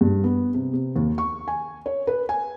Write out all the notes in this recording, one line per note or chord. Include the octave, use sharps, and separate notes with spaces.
G2
B3
C3
C3
D#2
C#6
G#5
C#5
B4
G#5